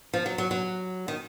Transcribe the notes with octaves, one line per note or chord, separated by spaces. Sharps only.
F3
F#3
F#3
F#3
D#3